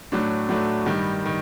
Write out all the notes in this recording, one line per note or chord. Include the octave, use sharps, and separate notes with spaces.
A2 F#3 A3 D4
A2 F#3 A3 D4
G2 D#3 G3
D#3